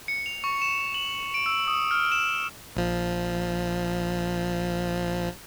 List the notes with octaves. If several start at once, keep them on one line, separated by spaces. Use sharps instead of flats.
C#7
F7
C#6
E7
F#7
D7
E6
D#6
F6
E7
A#1 F3